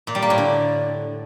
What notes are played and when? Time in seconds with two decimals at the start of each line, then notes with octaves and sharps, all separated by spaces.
0.07 A#2
0.15 G3
0.22 A#3
0.30 A2
0.38 D3